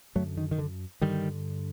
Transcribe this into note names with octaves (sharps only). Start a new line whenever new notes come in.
F#2 D3 F#3 A3
D#3
D#3
D3
G2 D3 D#3 G3